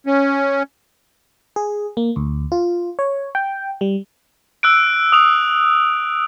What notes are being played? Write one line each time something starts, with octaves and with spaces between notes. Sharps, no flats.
C#4
G#4
A#3
D2
F4
C#5
G5
G3
E6 F#6 D7
D#6 F7